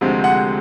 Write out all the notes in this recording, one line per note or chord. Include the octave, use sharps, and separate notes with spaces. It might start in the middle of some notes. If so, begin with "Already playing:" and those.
D2 C3 F3 G#3 C4
F#5